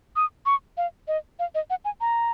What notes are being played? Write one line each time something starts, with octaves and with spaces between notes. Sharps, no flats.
D#6
C#6
F5
D#5
F5
D#5
F#5
G#5
A#5